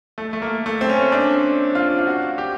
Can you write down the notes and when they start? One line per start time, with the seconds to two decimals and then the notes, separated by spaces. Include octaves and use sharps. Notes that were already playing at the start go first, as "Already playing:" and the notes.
0.18 A3
0.33 A3
0.42 A#3
0.66 A3
0.81 C4
0.89 C#4
1.12 D4
1.75 F4
1.99 F4
2.07 F#4
2.38 G4